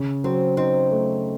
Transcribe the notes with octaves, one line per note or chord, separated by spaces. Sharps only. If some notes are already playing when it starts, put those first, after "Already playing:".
Already playing: C#3
F#3 C4
C4 D#4
A3